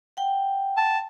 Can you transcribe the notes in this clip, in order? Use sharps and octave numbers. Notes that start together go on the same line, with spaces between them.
F#5 G5
A5